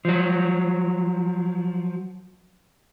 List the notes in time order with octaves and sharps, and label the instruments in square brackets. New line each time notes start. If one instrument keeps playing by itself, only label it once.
[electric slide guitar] F3 F#3